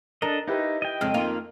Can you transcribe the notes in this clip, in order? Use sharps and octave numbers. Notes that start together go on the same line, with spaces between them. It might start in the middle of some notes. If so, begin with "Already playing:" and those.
D4 A4 A#4 D#5
D#4 E4 G4 B4
D#5 G5
F2 C#3 G#3 C4 F6
D#3 A#3 F4